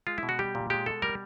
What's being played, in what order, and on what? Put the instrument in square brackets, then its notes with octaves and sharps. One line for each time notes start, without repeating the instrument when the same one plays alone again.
[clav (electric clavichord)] G#3 F4
E4
B2
F#4
G3 G4
A#2
G#3 G4
B2 A4
G3 A#4